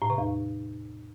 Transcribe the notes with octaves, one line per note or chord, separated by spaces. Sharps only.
A2
C3
E2